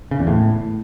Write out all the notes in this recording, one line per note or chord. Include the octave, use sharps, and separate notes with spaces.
C#3
E2
A2